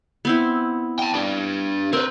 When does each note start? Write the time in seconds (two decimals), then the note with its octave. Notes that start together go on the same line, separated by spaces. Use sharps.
0.25 B3 C4 E4
0.99 G5 A5
1.13 D4 G4
1.93 C4 A#4 B4